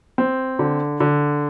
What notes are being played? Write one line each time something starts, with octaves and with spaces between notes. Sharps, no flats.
C4
D3
D3